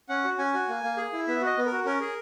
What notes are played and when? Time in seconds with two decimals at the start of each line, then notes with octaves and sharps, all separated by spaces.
0.09 C#4 F#5
0.24 F#4
0.38 C#4 G#5
0.54 F#4
0.69 A#3
0.83 A#3
0.97 G#4
1.13 E4
1.28 B3 E5
1.41 F#4 D#5
1.57 B3
1.66 A#4
1.72 F#4
1.86 C#4 A#4
2.01 G#4